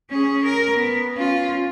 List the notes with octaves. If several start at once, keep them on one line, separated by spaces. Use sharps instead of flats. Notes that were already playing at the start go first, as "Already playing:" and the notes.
C#4 G#4
A#4
B3
C#4 F4